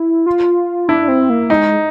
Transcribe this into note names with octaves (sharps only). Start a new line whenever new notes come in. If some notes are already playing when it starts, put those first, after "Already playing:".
Already playing: E4
F4
D4 E4
C4
A#3
G#3 D#4